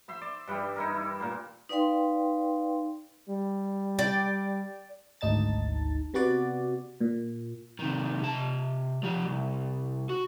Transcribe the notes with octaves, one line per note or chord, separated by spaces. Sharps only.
C5 E5 C6
D5
G2 E3 G3
D#4 E4 A#4
E4
A#2 A#4 C5
D#4 B4 D5 F5 G5 C6
G3
D5 G5
G#1 D2 D#4 A5 A6
C3 B3 F#4 D5
A#2
C3 D#3
C3 A5
F3 G4
C2
F#4